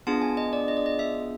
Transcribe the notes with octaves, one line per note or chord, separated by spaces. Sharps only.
B3 D4 F4 G#4 A5
G#5
D#5
D5
D#5
D5
D#5
E5